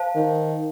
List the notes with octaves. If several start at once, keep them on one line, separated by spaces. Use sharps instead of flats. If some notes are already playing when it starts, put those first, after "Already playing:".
Already playing: C5 F5 A5
D#3